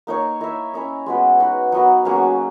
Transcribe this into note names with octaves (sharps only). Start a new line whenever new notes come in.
A#3 D#4 A#4 C#5
E4 A#4 E5
C#4 E4 A#4 D#5
G#3 B3 F#4 B4
D#4 F#4 B4
F#3 B3 D#4 A#4
F#3 A#3 C#4 G#4